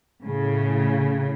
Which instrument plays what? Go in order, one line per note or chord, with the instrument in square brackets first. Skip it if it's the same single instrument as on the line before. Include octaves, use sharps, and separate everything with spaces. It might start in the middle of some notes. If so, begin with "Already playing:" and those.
[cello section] A2 C#3